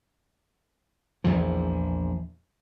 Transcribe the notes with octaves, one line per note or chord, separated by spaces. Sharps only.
A#1 E2 E3 F3